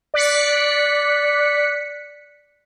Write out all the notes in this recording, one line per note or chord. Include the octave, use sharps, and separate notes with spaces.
D5 F#6 B6 C#7